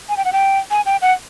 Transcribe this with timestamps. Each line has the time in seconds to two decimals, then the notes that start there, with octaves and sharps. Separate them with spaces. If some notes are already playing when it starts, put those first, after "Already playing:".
0.09 G#5
0.17 G5
0.25 F#5
0.33 G5
0.71 G#5
0.86 G5
1.02 F#5